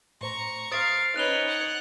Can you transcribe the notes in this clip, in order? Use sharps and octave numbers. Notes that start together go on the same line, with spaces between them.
A2 C5 A#5 C#6
C5 F5 D#6 A6 D7
C#4 D#4 B4 C#5 F#6 F7 G7
F#5